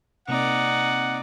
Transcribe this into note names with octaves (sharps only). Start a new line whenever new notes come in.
C3 A#3 C4 D#4 D5 F#5